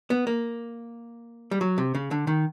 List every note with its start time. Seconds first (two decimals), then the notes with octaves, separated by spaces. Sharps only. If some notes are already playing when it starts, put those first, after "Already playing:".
0.10 B3
0.27 A#3
1.51 G3
1.61 F#3
1.78 C3
1.95 C#3
2.11 D3
2.27 D#3